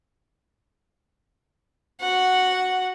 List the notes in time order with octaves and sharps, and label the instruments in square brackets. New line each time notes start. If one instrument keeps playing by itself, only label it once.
[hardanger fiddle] F#4 F#5